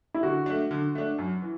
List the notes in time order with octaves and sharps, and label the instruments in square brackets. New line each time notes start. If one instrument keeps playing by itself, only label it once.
[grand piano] E4
[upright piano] D3 [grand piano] F#4
[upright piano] A3 D4
D3
A3 D4
F#2
E3